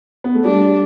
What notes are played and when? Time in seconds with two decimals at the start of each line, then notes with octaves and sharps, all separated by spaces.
0.24 B3
0.35 A3
0.45 G3 D4